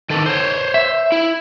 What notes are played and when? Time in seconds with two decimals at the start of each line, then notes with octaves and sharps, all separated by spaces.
0.10 D#3 E3 A4
0.26 C5 C#5
0.74 E5
1.12 E4